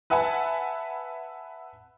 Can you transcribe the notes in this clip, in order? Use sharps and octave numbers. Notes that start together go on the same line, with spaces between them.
B4 E5 F#5 G#5 A5 B5